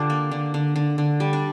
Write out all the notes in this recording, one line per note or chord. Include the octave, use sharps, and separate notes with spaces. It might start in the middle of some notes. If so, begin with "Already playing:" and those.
Already playing: D3 D4 F4 G4
A#3
D3
D3
D3
D3
G3
D4